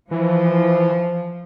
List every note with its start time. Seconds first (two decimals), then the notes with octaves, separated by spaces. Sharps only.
0.11 E3 F3